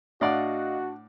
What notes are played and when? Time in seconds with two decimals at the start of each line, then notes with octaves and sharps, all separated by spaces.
0.21 A2 D4 F#4 D5 D#5 F5 F#5